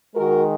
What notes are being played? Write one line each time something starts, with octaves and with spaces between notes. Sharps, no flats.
D#3 G#3 F#4 A#4